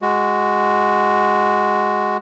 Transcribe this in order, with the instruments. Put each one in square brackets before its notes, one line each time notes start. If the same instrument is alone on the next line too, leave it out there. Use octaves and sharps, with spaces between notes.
[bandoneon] G#3 F#4